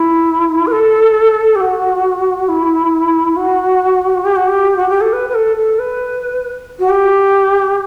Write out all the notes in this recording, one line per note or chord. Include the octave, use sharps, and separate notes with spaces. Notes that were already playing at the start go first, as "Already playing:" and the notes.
Already playing: E4
B4
A4
G4
F#4
E4
F#4
G4
F#4
G4
F#4
G4
A4
B4
B4
A4
A4
B4
F#4
G4